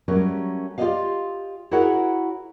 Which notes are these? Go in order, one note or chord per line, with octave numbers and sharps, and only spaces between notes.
F#3 G3 A3 C#4 A#4
F4 G4 C5 D5 D#5 F5
E4 F#4 G#4 A#4 C#5 F#5